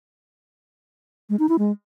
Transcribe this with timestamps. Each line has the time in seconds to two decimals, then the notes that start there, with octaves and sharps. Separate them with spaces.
1.30 G#3
1.39 D#4
1.49 E4
1.59 G#3